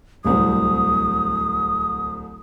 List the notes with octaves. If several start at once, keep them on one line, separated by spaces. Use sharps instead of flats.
D1 C2 C4 D#6